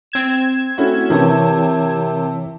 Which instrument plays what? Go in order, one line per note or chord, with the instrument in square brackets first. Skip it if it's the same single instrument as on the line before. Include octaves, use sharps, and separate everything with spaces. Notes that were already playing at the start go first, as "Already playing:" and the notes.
[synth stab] C4 G#6 E7
[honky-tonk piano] A3 C#4 E4 [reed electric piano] F#4
[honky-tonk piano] C3 [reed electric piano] E3 E4 C#5 [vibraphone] A#4 A5